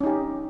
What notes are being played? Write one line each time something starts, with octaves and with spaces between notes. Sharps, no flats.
C#4 D#4 G4